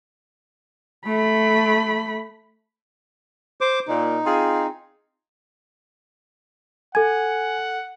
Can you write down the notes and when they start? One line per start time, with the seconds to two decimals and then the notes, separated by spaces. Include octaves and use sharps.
1.07 A3 B5
3.61 C5 D6
3.87 A#2 D#4
4.25 C4 F4 G#4
6.95 A4 F#5 G#5 G#6